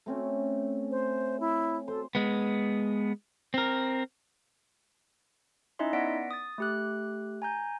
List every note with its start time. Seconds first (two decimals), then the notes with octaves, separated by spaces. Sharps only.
0.06 A3 C4 C#4
0.91 C5
1.40 E4
1.88 A4 C5
2.15 G#3 B3
3.54 C4 A#4
5.79 C#4 D#4 E4 D#5 E5 C6
5.93 B3 D5 F#5 A#6 B6 D7
6.31 D#6 A6
6.58 A3 G4 F#6
7.42 G#5 A#5 G6